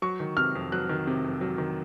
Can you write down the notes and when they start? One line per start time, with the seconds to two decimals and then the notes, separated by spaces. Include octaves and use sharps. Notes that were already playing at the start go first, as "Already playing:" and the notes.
0.02 F#3 C#6
0.20 D#3
0.37 C3 F6
0.55 F2
0.72 F#3 F#6
0.89 D#3
1.07 C3
1.24 F2
1.41 F#3
1.58 D#3